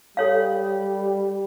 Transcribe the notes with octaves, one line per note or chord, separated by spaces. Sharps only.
G3 A4 C#5 F5